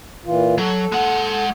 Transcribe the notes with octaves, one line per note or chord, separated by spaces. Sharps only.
A#2 E3 F4
F#3 A4
G#3 F#5